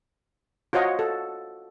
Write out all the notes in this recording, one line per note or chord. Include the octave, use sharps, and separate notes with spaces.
F4 F#4 C5 C#5 D#5 F#5
A4